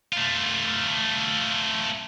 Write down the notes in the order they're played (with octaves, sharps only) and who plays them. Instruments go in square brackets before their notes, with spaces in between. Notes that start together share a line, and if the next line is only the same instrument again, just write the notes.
[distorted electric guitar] A3 F4